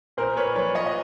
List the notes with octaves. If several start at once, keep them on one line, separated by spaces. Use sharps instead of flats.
A#2 A#4 C5
B4 C#5
D5
F3 B4 C#5
C#5 D#5
D#5